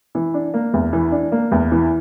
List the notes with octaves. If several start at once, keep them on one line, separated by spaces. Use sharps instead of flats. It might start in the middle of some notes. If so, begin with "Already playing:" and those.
E3
D4
A#3
E2
E3
D4
A#3
E2
E3